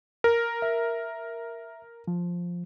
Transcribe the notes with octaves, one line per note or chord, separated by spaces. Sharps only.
A#4
E5
F3